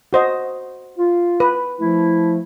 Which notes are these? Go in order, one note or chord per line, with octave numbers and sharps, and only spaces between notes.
F#4 C5 D#5
F4
B4
F3 A3 E4